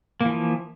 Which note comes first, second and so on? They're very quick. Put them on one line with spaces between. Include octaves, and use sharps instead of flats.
A#3 E3 F3